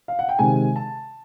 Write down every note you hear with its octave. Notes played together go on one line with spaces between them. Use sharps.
F5
F#5
G5
C3 D#3 G#3 G#5
A5